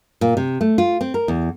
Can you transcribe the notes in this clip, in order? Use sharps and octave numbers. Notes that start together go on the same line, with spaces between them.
A#2
C3
A3
F4
C4
A#4
E2